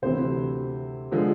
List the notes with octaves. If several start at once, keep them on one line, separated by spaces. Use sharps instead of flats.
D2 C3 E3 C5
D3 F3 G#3